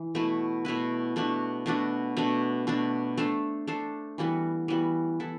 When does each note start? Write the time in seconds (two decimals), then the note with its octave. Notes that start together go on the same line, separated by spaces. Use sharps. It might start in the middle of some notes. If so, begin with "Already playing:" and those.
Already playing: E3
0.15 B2 A3 E4 B4
0.65 B2 A3 E4 B4
1.16 B2 A3 D4 F#4
1.66 B2 A3 D4 F#4
2.17 B2 A3 D4
2.67 B2 A3 D4
3.17 A3 D4 A4 C5
3.67 A3 D4 A4 C5
4.18 E3 G3 B3 F#4
4.68 E3 G3 B3 F#4
5.20 B3 E4 A4